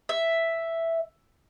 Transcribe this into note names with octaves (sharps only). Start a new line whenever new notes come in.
E5